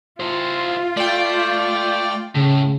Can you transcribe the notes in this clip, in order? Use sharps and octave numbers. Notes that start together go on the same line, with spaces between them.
E4 F4 C5
A3 D5 G5
A2 C#3